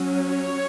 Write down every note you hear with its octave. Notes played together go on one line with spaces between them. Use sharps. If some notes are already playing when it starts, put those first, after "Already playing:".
Already playing: F#3 C#4
C#5